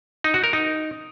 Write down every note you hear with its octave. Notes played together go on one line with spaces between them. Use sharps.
D#4
F#4
A#4
D#4